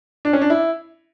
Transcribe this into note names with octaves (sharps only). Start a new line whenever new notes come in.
D4
C#4
D4
E4